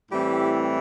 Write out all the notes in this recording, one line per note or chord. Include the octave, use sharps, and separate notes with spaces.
A2 E3 G3 C4 G4